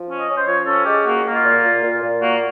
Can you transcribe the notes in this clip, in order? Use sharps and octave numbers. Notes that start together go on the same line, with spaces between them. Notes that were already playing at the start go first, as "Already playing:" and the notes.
Already playing: F3
C#4
D#5
C#4
C5
F3 C#5
C#4 A4
G#3 G4
A#3 F#4
A#3
F4
A#2
A#2
A#2
A#2
A#3 F#4